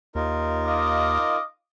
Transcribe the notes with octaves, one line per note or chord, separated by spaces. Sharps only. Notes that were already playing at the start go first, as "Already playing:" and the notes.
D#2 D#4 F4 A#4
D#5 F5 D6